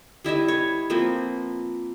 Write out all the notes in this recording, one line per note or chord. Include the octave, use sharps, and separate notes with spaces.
G3 E4 D#5 E5
C#5
F3 A#3 C4 B4